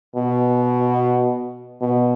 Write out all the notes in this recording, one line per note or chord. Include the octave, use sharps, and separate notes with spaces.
B2
B2